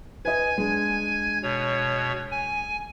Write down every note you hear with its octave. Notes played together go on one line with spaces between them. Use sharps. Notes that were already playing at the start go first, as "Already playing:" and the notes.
B4 D#5 G#5 G#6
G#3 D4
B2 C#5
G#5